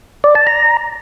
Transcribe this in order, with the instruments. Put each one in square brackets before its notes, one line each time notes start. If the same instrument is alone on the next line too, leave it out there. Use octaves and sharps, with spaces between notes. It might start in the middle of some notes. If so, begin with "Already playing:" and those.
[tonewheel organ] D5
A5
A#5